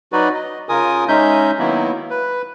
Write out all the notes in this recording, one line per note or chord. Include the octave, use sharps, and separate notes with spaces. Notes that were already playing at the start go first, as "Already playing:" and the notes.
F#3 D#4 F#4 B4 D5
D#5
C#3 F4 A#4 G#5 D#6
G#3 C#4 D#4 E5 G6
D#3 F#3 A#3 B3 E4
B4